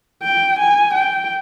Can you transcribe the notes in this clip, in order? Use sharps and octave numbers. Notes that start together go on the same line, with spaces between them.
G5
G#5
G5